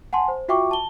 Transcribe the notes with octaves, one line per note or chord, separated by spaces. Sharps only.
F#5 G#5 A5 C6
C5
F4 F#4 E5 G5 C#6 D6
A5 G7